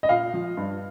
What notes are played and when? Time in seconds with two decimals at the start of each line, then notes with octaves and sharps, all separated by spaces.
0.03 D#5
0.09 A#2 F5
0.34 F3
0.57 G2